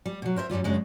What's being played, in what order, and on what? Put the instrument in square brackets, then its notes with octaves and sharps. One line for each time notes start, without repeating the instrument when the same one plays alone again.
[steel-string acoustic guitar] G3
B2 F#3
A#4 C5 D5 E5
F#2 F#3 G3 F4
F#2 C#3 G#3 D4